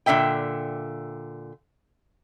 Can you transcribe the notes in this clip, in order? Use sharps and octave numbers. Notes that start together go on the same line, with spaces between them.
A#2 D3 A3 E5 G5